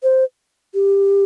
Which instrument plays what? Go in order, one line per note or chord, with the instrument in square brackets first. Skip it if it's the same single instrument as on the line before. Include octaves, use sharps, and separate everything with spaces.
[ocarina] C5
G4